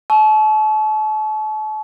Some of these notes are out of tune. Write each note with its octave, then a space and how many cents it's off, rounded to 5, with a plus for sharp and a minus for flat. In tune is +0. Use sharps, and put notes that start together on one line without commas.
A5 -40 C#6 +15 E6 +5